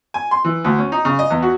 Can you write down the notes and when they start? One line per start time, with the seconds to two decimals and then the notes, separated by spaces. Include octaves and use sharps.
0.14 G#5
0.31 C6
0.44 E3
0.64 D2
0.79 C#4
0.92 D#4
1.05 C#3
1.19 D#5
1.31 E2
1.42 F#4